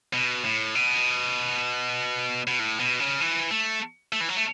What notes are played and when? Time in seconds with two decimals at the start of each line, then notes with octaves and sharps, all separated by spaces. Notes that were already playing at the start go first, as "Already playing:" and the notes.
0.13 B2
0.45 A2
0.75 B2
2.47 B2
2.59 A2
2.80 B2
3.00 C#3
3.21 E3
3.51 A3
4.12 A3
4.21 E3
4.29 F#3
4.36 A3